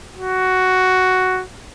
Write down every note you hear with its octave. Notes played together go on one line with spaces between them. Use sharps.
F#4